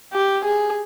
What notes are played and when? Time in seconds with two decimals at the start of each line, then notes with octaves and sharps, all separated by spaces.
0.13 G4
0.44 G#4